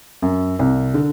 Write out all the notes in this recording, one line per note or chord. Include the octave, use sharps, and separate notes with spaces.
F#2
C2
D3